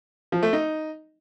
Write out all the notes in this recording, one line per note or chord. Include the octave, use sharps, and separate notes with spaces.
F3
A3
D#4